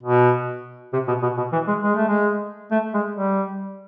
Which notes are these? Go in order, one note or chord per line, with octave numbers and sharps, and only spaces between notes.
B2
C3
B2
B2
B2
E3
G#3
G#3
A3
G#3
A3
G#3
G3